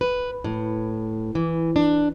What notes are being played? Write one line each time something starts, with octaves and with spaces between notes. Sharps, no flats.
B4
A2
E3
D4